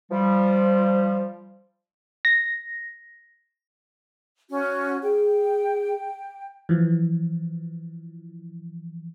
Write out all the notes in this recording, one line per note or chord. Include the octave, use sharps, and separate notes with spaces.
F3 G3
A#6
C#4 F#4
G#4 G5
E3 F3